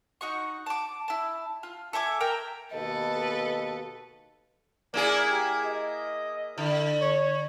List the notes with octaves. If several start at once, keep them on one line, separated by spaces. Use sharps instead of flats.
D#4 F#4 C#6
A5 D6
E4 A5
F4
A4 E5 G#5 D6
A#4 E5 G5 A#5
D#2 B2 A4 B4 D#5
A#3 E4 G#4 D5
G4
D#5
D3 E4
C#5